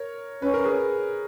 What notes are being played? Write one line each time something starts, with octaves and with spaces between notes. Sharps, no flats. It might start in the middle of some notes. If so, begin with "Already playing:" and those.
Already playing: A#4 C#5
C#4 B4
A#4
G#4 B4